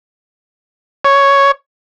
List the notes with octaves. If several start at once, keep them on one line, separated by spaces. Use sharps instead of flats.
C#5